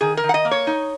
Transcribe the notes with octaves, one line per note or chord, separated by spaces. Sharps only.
D#3 G#4
A#4
D#3
F#5
D#5
A#3
C#5
D#4